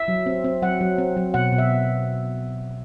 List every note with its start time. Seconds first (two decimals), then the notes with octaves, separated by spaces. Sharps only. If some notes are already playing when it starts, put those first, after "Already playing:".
Already playing: E5
0.08 F#3
0.26 C4
0.44 C4
0.62 F#3 F#5
0.80 F#3
0.98 C4
1.17 F#3
1.34 B2 F#5
1.52 B2
1.58 E5